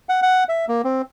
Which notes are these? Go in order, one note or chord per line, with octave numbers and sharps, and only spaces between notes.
F#5
F#5
E5
A#3
C4